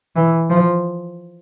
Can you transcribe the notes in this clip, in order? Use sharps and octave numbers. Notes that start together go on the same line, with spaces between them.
E3
F3